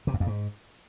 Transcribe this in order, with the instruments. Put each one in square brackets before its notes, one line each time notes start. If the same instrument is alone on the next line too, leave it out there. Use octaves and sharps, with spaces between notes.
[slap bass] C3
F#2
F2
G#2